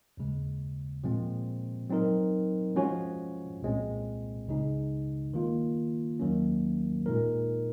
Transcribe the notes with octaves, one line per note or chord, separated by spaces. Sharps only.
D#2 C#3 G#3
A#2 F3 G#3 C4
F#3 C4 D#4 A#4
F3 G#3 C#4 F#4 C#5
C2 A#2 G#3 C4
C#2 C#3 G#3 D#4
D#3 A#3 F4
D#2 D#3 F#3 A#3 C#4
A#2 G#3 D#4 A#4